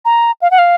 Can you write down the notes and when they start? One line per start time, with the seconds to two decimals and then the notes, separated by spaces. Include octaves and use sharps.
0.05 A#5
0.42 F5
0.51 F#5
0.58 F5